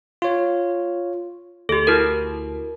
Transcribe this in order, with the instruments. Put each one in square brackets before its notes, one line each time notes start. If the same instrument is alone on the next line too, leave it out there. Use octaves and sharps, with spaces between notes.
[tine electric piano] F4 C#5
[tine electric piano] D2 [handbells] G4 A4
[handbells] E4 F#4 A#4